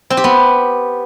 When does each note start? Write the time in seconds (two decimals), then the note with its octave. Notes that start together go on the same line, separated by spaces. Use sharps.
0.10 C4
0.17 G4
0.24 B3